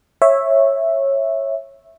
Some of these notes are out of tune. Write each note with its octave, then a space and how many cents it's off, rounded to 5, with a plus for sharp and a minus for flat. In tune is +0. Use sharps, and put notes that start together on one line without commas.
C#5 -15 E5 +0